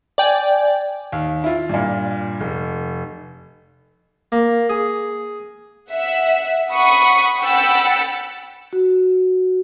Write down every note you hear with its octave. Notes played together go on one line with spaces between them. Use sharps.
D5 G5 G#5
D#2
E4 F4
G2 A#2
F1
A#3
G#4
E5 F#5
F#5 B5 C#6 D#6
F#5 G5 B5 E6 A6 C#7
F#4